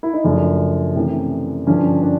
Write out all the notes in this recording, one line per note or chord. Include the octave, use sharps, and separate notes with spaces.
E4
D#4
F#2 C#3 F3 A3 D4
C3 E3 A3 C#4
G2 D3 F3 C#4
D4